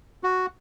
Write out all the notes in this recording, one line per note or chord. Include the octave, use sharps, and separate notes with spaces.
F#4